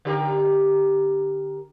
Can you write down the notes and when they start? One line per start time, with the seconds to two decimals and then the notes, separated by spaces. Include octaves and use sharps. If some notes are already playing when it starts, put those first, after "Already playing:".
0.05 D3 G4 A#4